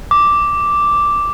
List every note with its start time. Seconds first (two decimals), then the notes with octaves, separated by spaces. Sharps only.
0.11 D6